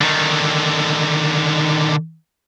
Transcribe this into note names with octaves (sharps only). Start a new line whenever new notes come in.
D3 D#3